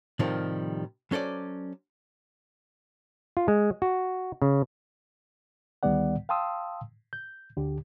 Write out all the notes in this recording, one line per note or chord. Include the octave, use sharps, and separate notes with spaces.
A2 C3 D#3 F3 G3
F#3 C#4 A4 C5 D5
F4
G#3
F#4
C#3
D2 D#3 G3 B3 D5 F#5
F5 G5 A5 C6 D#6 E6
G6
D2 D3 G4